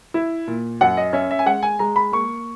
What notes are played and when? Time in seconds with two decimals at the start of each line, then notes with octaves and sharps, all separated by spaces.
0.14 E4
0.48 A#2
0.81 F#2 F#5
0.97 D#5
1.13 C#4 E5
1.31 E5
1.39 G#5
1.46 G#3 F#5
1.63 G#5
1.79 G#3 A#5
1.96 B5
2.12 A#3 C#6